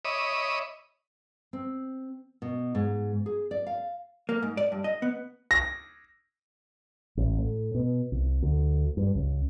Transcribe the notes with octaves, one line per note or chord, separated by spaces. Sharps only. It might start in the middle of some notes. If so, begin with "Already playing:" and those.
C#5 D#5 E5 B5 D6 D#6
C4
B2
G#2
G#4
D5
F5
A#3
G#2
D5
G2
D#5
B3
A#6
A1
A2
B2
C2
D2
G2
C#2